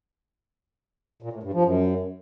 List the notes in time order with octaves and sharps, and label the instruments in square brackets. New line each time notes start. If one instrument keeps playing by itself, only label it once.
[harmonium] A#2
A2
G2
F3
F#2